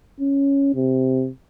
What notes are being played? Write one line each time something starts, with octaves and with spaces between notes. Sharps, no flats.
C#4
C3